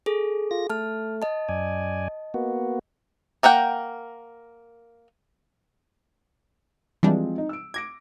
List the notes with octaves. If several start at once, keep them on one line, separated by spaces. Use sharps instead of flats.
G#4 A4
F4 A#6
A3 A5 F6
D#5 A5
F#2 D5 G#5
A#3 B3 F#4
A#3 A#4 F#5 G5
E3 F3 G3 G#3 C4 D4
D#4
E6 D7
D6 G#6 A#6 D7